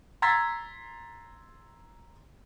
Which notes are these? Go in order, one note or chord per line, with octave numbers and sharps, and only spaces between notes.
A#5 C6 E6 G#6 A6 B6